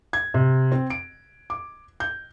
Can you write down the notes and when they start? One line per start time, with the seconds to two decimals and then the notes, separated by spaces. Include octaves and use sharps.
0.13 G#6
0.34 C3
0.72 C4
0.90 D7
1.50 D6
2.00 G6